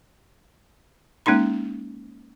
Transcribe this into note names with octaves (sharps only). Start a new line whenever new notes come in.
G#3 A#3 C#4 D#4 B5